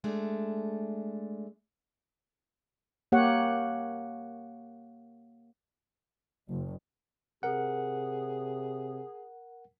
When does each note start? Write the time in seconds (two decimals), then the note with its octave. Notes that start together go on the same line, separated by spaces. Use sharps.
0.04 G#3 A3 D4
3.12 A#3 G4 C#5 F#5
6.49 F#1
7.43 C3 G#4 A#4 F#5